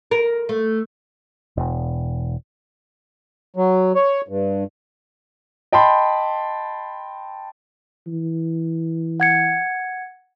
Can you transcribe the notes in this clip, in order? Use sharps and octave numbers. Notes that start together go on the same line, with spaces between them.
A#4
A3
E1
F#3
C#5
G2
D#5 G5 A5 B5 C6
E3
F#5 G#6 C#7